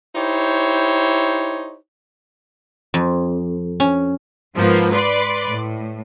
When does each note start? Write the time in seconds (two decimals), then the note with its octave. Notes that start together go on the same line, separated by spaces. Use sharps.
0.16 D#4 E4 G4 C5 C#5
2.94 F2
3.80 C#4
4.55 G#2 F3 A#3 B3
4.92 B4 D5 C6
5.47 A2